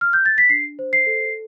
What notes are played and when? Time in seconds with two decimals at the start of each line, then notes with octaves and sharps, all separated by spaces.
0.01 F6
0.13 G6
0.25 A6
0.38 B6
0.49 D4 C7
0.79 C5
0.93 C7
1.06 A4